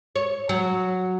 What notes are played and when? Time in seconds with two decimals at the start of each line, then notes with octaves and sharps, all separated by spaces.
0.16 C#5
0.49 F#3